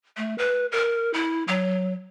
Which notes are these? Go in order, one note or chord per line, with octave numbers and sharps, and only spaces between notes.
A3
B4
A#4
E4
F#3